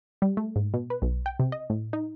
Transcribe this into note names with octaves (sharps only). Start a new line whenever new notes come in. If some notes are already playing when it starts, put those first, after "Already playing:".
G3
A3
G#2
B2
B4
B1
G5
C3
D#5
A2
D#4